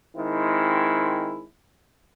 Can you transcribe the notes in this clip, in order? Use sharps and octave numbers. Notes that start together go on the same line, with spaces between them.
D#3 G#3 C4 E4